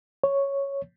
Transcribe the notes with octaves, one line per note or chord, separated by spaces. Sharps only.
C#5